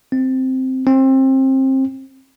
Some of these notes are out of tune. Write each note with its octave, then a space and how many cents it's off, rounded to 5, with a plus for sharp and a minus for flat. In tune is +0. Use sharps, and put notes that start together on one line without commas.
C4 -5
C4 +25